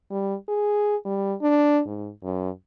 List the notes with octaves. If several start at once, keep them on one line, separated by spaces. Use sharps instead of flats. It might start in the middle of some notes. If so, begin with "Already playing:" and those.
G3
G#4
G3
D4
G#2
F#2